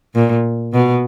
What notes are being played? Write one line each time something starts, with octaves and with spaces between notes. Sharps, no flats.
A#2
B2